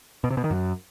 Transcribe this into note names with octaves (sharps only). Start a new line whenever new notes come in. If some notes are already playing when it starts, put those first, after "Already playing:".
B2
C3
B2
D#3
F#2